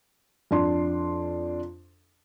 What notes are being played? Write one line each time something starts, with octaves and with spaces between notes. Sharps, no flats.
F2 D4 C6